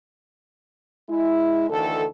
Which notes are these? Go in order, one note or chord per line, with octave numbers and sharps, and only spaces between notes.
G#3 E4
D2 D#3 E3 A4